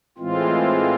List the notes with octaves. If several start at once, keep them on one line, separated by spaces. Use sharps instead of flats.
A2 E3 G#3 C4 F4